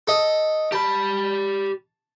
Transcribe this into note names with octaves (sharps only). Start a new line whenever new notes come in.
A4 D#5
G4 A5 B5